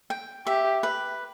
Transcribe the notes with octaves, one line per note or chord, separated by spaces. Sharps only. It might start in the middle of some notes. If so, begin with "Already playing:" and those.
G5
G4 E5
B4